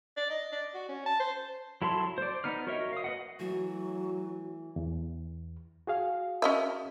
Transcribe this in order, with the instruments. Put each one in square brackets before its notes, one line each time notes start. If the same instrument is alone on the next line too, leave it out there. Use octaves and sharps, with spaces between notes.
[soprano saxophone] D5
D#5
D5
F#4
C#4
A5
C5
[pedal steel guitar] F#3 E4 A4 A5 C6
C5 D5
B3 D#4 F6
F#4 A#4 C#5 D#5 E5
F5 D#6
B4 D#5 F#5
[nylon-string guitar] E3 A3 [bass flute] F#3 [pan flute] F#4
[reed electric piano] E2
F#4 G#4 F5
[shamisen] C#4 D#5 E5